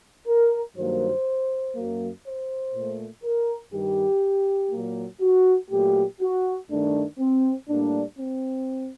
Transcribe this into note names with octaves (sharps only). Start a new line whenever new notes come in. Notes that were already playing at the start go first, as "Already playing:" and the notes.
A#4
G2 D#3 F#3 A#3 C5
F#2 F#3 A#3
C5
A#2 A3
A#4
G2 D#3 G3 G4
A#2 F#3 A#3
F#4
A#2 F#3 A3 G4
F#4
G2 D#3 A3 D4
C4
A2 G3 A#3 D4
C4